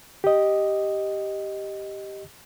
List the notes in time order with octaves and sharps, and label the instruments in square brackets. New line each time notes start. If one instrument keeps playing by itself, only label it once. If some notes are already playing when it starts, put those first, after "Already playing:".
[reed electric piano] G4 D#5